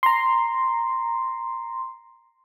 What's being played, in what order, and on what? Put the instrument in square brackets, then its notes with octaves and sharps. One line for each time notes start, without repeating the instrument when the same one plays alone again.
[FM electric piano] A#5 C6